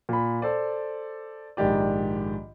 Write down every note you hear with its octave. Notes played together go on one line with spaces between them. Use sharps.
A#2 B5
A4 C5 D5
A#1 G#2 D#3 G4 D5